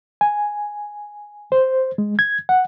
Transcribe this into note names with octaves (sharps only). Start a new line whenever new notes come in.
G#5
C5
G#3
G#6
F#5